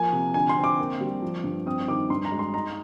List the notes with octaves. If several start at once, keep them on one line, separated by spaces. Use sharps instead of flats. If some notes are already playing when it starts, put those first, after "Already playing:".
Already playing: F3 A#3 G#5
C3
D3 G#5
C6
C4
D6
A#3
G3
F3
G2
C4 D#6
D#3 D6
G2 C6
A#5
G#3
C6
D#4 A#5